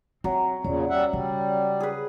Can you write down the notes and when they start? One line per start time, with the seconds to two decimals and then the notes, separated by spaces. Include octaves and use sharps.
0.24 F#3 C4 C#5 E5
0.65 E2 A#2 C#3 C#4 C#5 D5
0.90 G3 E5 F#5
1.13 C#3 G3
1.80 G#4 B4